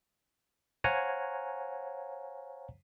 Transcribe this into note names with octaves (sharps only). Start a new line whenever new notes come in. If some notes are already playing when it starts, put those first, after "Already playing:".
C5 C#5 F5 F#5 G#5 A#5